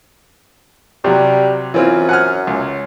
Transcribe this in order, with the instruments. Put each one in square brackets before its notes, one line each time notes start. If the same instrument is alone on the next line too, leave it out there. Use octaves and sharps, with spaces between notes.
[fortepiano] C3 F#3 [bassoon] G3
[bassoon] F#2 [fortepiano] E3 C4 F4
[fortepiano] F#5 G#5 F6
C#2